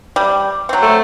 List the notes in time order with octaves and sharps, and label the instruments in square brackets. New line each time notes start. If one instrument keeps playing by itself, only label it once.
[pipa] G3
F#3 C4
[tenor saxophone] A3